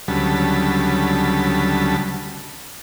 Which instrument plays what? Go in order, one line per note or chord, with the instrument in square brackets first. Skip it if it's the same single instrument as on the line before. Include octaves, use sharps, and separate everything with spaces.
[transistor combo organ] D2 C#3 F#3 G3 A5 B5